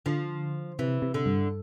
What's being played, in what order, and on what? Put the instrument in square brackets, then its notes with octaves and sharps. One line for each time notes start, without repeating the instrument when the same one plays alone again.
[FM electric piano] D3 [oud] F3
[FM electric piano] C3 [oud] E3
[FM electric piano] C3
[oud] D3
[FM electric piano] G2